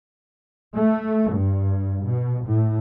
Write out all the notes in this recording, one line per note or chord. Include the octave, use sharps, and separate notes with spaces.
A3
G2
B2
A2